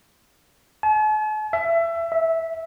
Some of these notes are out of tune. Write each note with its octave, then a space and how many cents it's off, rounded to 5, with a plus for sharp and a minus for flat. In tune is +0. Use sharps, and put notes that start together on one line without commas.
A5 -45
E5 +25
E5 -10